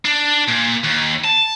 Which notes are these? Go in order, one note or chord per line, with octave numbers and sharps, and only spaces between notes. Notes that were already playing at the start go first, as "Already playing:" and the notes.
D4
A#2
D#2
A5